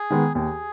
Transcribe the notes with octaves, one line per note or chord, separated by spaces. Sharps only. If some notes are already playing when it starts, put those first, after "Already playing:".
Already playing: G#4
D#3 G#3 B3
D#2 G#4